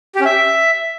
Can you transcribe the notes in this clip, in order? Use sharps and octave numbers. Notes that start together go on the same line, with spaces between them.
G4
C#4
E5